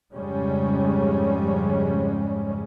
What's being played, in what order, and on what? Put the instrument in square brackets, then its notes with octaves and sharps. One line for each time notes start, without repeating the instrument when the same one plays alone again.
[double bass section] F2 G#2 C#3 G3 G#3 C#4